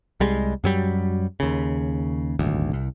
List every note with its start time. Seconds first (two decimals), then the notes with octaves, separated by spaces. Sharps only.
0.20 C2 G3 G#3
0.64 F#2 F#3 G3
1.40 D#2 C#3
2.39 D#1 G#1 D2
2.73 C2